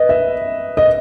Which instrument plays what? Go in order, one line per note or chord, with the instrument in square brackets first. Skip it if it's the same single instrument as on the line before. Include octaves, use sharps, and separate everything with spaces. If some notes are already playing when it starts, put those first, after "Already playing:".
Already playing: [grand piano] B4 D#5
E5
D#5